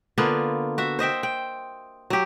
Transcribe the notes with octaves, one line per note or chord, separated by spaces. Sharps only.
D3 A#3 B3 F4
F#4 E5
C5 D#5 E5 G5
G5
F#3 G4